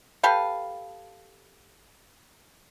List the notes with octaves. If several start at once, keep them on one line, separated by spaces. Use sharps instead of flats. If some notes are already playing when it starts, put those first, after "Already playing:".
G4 A4 B4 F5